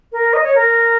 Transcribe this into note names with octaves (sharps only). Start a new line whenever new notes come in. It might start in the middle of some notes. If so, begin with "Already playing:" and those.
A#4
D#5
C#5
A#4